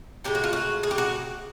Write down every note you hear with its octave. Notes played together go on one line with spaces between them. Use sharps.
A2 E3 G#3 G4
F#4
F4
F#4
G#4
G4
F#4